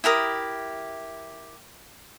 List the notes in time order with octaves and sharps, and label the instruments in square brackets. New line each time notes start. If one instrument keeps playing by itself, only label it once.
[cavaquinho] E4 G4 A#4 D#6